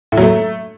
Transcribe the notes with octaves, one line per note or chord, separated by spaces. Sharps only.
A2
F#3
A3